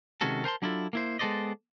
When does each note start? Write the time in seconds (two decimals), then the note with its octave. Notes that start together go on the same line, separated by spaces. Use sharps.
0.21 C3 D#3 G#3 C#4 F#4 A4
0.44 A#4 C5 G#5 A5 C6
0.62 F#3 D4 E4 F4 A4
0.93 A#3 E4 C5
1.19 G#3 B3 A4 C5 D5 D#5